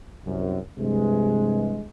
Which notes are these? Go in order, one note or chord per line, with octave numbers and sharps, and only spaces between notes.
C2 F#2
G2 C3 E3 G#3